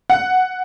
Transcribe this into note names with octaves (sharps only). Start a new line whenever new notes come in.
F#5